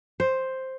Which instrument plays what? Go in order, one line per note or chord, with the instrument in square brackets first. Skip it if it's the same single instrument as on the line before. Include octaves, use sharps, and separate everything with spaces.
[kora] C5